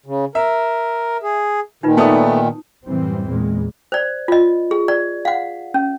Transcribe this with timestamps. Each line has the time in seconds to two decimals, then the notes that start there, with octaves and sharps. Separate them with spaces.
0.06 C#3
0.35 A#4 E5
1.23 G#4
1.83 A#2 D#3 D#4 F4 B4
1.97 A3 B3 D5 A5 D#6
2.86 F#2 A2 E3 G3 C4
3.28 E2 A#2 G#3
3.92 C5 D5
4.28 F4 D#5
4.71 G#4
4.88 D5
5.25 F5 F#5
5.74 C#4